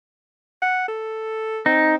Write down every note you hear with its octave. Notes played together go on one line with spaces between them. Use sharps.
F#5
A4
C4 D#4